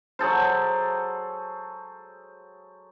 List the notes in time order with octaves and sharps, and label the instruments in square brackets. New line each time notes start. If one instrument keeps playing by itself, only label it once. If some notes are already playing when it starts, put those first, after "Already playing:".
[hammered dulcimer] F#3 G#4 A4 C5